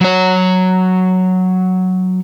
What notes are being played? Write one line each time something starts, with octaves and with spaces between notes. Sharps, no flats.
F#3 C#5